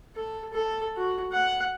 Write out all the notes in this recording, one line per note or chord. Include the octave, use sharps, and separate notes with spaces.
A4
A4
F#4
F#5